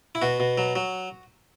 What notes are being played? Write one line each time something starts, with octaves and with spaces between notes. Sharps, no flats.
E4
B2 F#4
B2
F#3
F#3